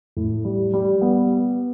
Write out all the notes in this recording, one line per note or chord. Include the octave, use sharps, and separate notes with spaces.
A2
G3
G3
B3